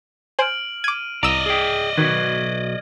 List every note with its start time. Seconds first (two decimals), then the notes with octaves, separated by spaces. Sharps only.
0.39 C5 G#5 F6 D7 F#7
0.84 D6 G#6 D#7
1.23 C2 D5 D#5 A#5 E6
1.46 G#4 G5
1.98 B1 D#3 F#4 B4 G#6